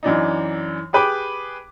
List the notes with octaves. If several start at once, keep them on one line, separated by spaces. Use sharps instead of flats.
F#2 E3 D4 D#4
G4 G#4 B4 G5 B5 D6